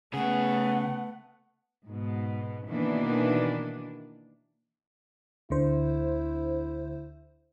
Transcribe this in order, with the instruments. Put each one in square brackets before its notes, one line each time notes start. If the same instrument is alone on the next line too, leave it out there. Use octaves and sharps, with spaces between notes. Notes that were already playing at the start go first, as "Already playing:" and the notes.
[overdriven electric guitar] C#3 G#4 [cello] A3 B3 [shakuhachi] F#5
[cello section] G#2 B2
B2 D#3 E3 A#3 D4
[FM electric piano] D2 D3 C5 [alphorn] E4